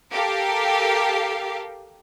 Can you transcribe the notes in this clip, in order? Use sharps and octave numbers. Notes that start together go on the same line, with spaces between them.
G4 A4 A#4 F5